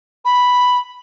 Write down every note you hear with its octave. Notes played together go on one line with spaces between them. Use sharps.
B5